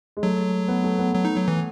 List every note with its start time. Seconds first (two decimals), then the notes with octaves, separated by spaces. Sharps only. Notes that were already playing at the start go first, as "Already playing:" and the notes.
0.17 G#3
0.23 F#3 A3
0.68 B3
0.84 A3
0.99 B3
1.14 F#3
1.25 D#4
1.36 F#3
1.48 E3